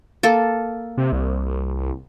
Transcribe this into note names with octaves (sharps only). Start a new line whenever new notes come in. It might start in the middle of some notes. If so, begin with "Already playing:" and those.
A#3 A4
C3
C2